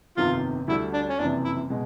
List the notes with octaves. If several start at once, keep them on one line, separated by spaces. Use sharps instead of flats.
G1 F2 C3 D#3 F4
D2 D3 G3 E4
D4
C#4
F#1 F2 C3 E3 D4
E4
B2 G#3